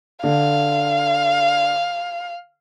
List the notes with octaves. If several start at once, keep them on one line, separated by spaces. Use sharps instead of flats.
D3 F5